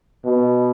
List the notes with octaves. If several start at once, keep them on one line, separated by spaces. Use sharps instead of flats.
B2